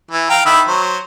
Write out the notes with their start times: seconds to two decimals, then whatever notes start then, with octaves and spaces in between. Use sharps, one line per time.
0.11 E3
0.30 F5 G5 A#5
0.46 D#3 E5 B5
0.67 F#3 C5